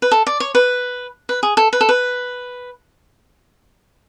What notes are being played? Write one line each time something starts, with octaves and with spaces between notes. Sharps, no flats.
B4
A4
D5
C#5
B4
B4
G#4
A4
B4
A4
B4